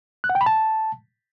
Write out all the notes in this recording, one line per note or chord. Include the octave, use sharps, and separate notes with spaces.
F#6
F#5
G5
B5
A5